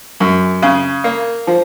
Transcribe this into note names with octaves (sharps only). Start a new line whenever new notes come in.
F#2
C#3
A#3
F3